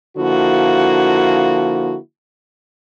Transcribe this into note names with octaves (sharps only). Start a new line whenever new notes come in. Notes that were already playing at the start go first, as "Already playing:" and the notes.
D3 F3 A#3 E4 F#4